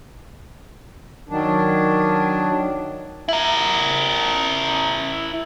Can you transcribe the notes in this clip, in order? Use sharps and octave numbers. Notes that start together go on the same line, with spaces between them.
D#3 F#3 D4
E4 A#4